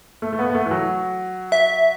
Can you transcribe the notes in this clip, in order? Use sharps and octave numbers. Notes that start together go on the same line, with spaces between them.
A3
A3
B3
B3
A3
E3
F#3
E5